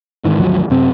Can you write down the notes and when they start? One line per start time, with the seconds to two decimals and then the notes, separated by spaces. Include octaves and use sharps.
0.25 G#2 D#3 E3
0.40 G#1 D2 F3 F#3
0.70 F#2 C3 C4